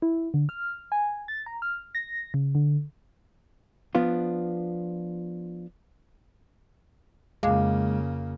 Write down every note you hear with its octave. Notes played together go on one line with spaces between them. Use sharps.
E4
D3
F6
G#5
A6
A#5
F6
A#6
C#3
D3
F3 B3 D4 F4
F2 C#3 G#3 A#3 F5 D6